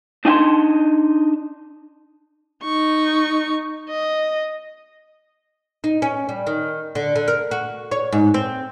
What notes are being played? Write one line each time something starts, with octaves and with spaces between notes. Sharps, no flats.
D4 D#4 F#5 G5 A5 C6
D#4 C#6
D#5
D#4
C#4
G3
D#3
D3
D3
A#4
F#4
C#5
G#2
C4